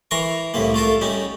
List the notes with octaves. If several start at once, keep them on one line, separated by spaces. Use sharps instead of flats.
E3 A#4 A#5 C6 C#6
C2 A2 C3 A#3
A3 F4 A4 A#4
G3 C#4 D#4